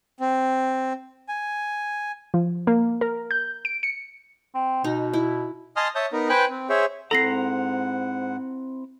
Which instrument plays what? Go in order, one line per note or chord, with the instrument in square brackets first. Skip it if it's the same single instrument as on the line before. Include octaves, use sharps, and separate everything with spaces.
[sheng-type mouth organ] C4
G#5
[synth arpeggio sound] F3
A#3
A#4
G6
D7
C#7
[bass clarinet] C4
[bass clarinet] B2 [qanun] D#4
[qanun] E4
[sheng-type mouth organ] D#5 G#5 A5 C6 D#6 F6
C#5 E5 A5 D#6 G6
B3 D#4 A#4
B4 C5 G5 G#5 B5 F#6
C4
G#4 C5 C#5 E5
[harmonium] G#2 F#5 [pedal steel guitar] C4 E4 A#5 [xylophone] A4 A#6 C7